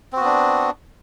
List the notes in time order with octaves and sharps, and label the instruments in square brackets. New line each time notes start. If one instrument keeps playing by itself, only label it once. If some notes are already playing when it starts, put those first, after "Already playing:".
[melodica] C4
F#4
B3
D4